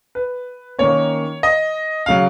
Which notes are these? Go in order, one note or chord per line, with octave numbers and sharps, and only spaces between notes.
B4
D#3 A#3 C#4 C#5
D#5
C#3 F#3 F5